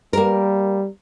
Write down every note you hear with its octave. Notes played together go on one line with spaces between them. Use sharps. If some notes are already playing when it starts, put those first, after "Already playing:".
G3 A#3 A#4